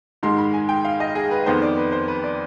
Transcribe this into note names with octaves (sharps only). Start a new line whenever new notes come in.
G#2 D#3 G#3 C6
B5
G#5
G5
F5
D#5
G#4
B4
F2 D#3 B3 C5
D5
B4
C5
B4
D5